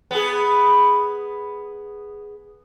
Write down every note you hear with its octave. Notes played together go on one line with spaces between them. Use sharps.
B3 G#4